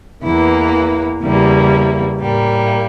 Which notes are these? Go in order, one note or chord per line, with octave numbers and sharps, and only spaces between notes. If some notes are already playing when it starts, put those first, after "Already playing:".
E2 E3 A#3 E4
E2 C#3 G3 A#3 E4
A2 G3 A#3